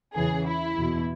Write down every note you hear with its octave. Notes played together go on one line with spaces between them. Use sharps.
E2 C#3 E3 G#4
E4
E2 B2